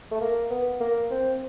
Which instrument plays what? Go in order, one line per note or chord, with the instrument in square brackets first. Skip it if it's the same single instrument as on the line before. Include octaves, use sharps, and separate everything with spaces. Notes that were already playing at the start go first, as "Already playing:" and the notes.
[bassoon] A3
A#3
B3
A#3
C4